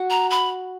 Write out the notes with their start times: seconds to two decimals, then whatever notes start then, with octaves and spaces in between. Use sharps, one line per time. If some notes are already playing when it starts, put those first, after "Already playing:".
Already playing: F#4
0.10 A#5
0.30 B5